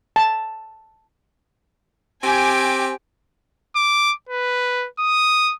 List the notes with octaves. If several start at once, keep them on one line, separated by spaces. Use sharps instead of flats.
A5
C4 G4 G#5 D6
D6
B4
D#6